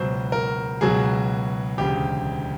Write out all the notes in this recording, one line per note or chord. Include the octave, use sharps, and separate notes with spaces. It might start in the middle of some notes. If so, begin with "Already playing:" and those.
Already playing: C#2 B2 F#3 C5
A#4
C#2 B2 F#3 G#4
E1 D2 C#3 G4